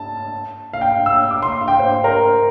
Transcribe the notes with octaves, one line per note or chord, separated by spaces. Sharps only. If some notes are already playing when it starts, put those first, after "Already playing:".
Already playing: A5
F5
G5
E6
D6
C6
F5
G5
C5
A#4